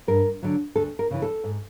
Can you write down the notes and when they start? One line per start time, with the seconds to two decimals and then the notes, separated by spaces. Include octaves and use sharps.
0.08 G2 A#4
0.43 D3 F#3
0.76 D2 A4
0.99 A#4
1.11 C#3 E3
1.22 A4
1.44 G#2